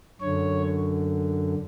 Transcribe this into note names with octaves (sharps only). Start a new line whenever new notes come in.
F#2 D3 C#5